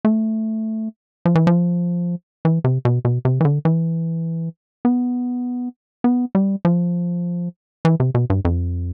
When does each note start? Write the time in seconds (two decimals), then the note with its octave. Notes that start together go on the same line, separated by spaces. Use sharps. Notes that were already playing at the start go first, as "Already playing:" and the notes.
0.05 A3
1.25 F3
1.35 E3
1.47 F3
2.45 E3
2.64 C3
2.85 B2
3.05 B2
3.25 C3
3.41 E3
3.45 D3
3.65 E3
4.85 B3
6.04 B3
6.35 G3
6.65 F3
7.85 E3
8.00 C3
8.15 B2
8.30 G2
8.45 F2